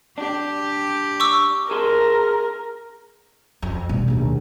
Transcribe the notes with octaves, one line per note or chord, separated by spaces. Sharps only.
D4 G4
C#6 D6 E6
G#4 A#4 A5 C6
F2
B2 G3
A#1 D#2